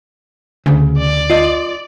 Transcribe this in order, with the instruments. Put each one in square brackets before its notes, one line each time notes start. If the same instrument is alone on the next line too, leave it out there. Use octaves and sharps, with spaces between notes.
[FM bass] D2 [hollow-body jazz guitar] C#3
[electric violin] D5
[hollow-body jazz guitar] F4 D#5